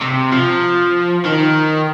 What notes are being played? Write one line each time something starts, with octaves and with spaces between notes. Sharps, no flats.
C3
F3
D#3